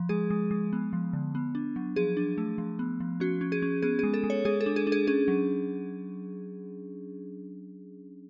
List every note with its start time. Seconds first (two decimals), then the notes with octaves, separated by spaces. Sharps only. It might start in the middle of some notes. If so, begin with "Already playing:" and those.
Already playing: F3
0.09 G#3 G#4
0.30 G#3
0.51 G#3
0.73 B3
0.93 F3
1.13 D3
1.35 B3
1.55 D4
1.76 F#3
1.96 F3 G#4
2.17 D4
2.38 A3
2.58 F3
2.79 B3
3.00 F3
3.20 C#4 F#4
3.41 C#4
3.52 G#4
3.62 C#4
3.83 B3 G#4
3.99 G#4
4.03 G#3
4.14 A4
4.24 G#3
4.30 C#5
4.45 G#3 G#4
4.61 A4
4.66 D4
4.76 G#4
4.87 D4
4.92 G#4
5.07 C#4 G#4
5.28 F#3